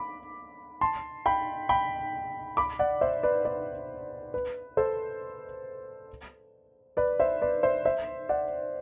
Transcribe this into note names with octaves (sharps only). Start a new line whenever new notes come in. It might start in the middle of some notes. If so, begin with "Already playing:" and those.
Already playing: B5 D6
A5 C6
G5 B5
G5 B5
B5 D6
D5 F#5
C5 E5
B4 D5
B4 D5
B4
A4 C5
B4 D5
C5 E5
B4 D5
C5 E5
C5 E5
D5 F#5